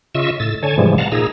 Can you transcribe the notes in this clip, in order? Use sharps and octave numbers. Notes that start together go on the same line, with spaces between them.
C#3 F4 D#5 E5 C#6 E6
A2 E6 A6
D3 C#5 G#5 A5
G#2 C3 E3 F3 G3 G#3
F5 F#5 A5 A#5
A#2 D#4 G#4 A#5 E6